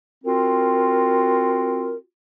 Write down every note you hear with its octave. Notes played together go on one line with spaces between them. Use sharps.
C4 F4 F#4 A#4